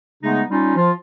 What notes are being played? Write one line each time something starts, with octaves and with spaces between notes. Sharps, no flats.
C#3 G#3 A3 B3 D#4
G3 C#4 D#4 F4
F3 F4